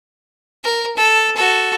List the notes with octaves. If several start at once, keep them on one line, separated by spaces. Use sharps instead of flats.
A#4
A4
F#4 A4